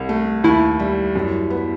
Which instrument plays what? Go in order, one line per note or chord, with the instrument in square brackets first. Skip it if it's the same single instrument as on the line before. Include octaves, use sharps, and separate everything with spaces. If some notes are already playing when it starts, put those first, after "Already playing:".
Already playing: [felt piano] C2
A3
[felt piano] D#2 [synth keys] E4
[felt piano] G3
F#2
B3